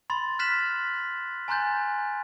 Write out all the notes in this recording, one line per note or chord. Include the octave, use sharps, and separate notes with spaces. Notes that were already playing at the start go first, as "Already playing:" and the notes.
B5 C6 A6
F6 F#6 A6 B6 E7 F#7
G#5 A#5 C6 F#6 G6 A6